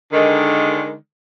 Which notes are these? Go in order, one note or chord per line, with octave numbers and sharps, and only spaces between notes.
D3 D#3 G#3